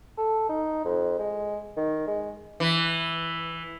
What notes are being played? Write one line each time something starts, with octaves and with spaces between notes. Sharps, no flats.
A4
D#4
F2
G#3
D#3
G#3
E3